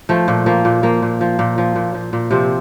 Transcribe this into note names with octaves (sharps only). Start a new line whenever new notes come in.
F3 A3
A#2
F3 A#3
A#2
F3 A#3
A#2
F3
A#2
F3
A#2
F3
A#2
C3 F3 C4